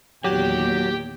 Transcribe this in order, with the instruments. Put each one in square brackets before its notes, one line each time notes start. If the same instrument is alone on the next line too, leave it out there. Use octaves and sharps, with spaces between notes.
[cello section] E2 A#2 D#3 [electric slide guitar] F#3 [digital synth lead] G4 [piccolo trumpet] G5